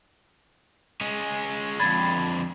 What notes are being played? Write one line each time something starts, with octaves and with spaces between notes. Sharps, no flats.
G#3 C#4
F2 D3 B5 G#6 A6